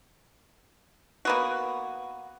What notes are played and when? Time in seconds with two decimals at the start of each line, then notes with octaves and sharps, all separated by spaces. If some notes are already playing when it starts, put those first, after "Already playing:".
1.25 A#3 B3 F#4